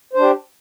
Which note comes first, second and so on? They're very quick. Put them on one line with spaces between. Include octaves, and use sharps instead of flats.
C5 D4 G4